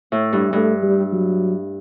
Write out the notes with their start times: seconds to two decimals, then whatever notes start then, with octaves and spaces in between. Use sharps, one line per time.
0.12 A2
0.33 G2
0.52 G2 A3
0.83 G3
1.13 F#3